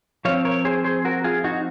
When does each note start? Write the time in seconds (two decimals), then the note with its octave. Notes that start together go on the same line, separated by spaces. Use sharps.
0.25 F3 C4 C#5 F5
0.45 A#4 C#5
0.65 G#4 C5
0.84 G#4 C5
1.05 F#4 A#4
1.24 F4 G#4
1.44 D#4 F#4